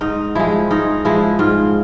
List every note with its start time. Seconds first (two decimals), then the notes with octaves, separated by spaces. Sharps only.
0.01 G#2 D#4
0.35 F3 G#3 E4
0.71 G#2 D#4
1.05 F3 G#3 E4
1.39 G#2 F4